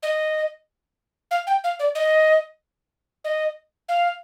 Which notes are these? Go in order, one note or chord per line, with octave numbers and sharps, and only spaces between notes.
D#5
F5
G5
F5
D5
D#5
D#5
F5